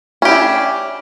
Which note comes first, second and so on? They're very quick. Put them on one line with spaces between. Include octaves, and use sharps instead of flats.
C#4 G4 E4 D4